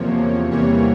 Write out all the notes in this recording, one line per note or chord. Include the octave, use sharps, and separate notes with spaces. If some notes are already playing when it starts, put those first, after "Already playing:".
Already playing: E2 C3 F3 A#3 C#5
E2 C3 E3 G3 A#3 C#5